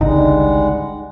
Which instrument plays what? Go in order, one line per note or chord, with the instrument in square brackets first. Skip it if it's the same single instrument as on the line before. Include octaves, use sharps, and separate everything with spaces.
[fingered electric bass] G#1 C#2 D3 [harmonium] G3 G#3 F#5 [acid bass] D#4